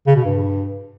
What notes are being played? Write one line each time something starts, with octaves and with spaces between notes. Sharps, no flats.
C#3
B2
G2